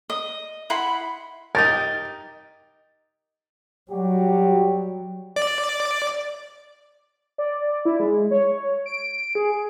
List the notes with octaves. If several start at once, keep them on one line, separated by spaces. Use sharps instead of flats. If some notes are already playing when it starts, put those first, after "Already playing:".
D#5
E4 F#5 B5 C6
D#4 G4 A#4 A6
F#3 G3 F#4 G4
D5
D5
E4
G#3
C#5
D7
G#4